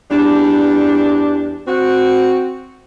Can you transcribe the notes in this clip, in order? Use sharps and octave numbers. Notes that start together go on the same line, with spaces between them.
E2 G3 D4
C4 F#4